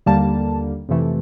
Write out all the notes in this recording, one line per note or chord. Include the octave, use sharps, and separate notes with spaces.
D#2 D3 G3 A#3 A5
F2 C3 E3 A3